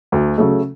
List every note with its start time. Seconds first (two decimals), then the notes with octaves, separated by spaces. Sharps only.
0.12 D2
0.38 C#3 F#3 A3